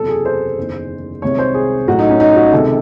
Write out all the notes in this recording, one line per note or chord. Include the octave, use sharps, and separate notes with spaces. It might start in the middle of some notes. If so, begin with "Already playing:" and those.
Already playing: F#1 E2 C3 F#3 A4
G#4
C5
F#1 E2 D#3
C2 C3 D#3 G#3 C#5
C5
G#4
A1 A2 F#3 F#4
D#4
C#4
D#4
F#4
C#2 C3 D#3 A4